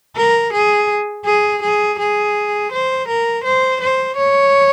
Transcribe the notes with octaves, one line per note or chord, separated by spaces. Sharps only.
A#4
G#4
G#4
G#4
G#4
C5
A#4
C5
C5
C#5